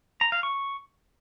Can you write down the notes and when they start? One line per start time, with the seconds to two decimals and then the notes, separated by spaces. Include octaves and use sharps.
0.21 A#5
0.32 F5
0.43 C#6